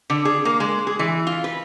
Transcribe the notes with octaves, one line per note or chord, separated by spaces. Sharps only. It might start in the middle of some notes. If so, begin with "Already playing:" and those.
D3
G#4
A#3
G#3
G#4
E3
F4
B4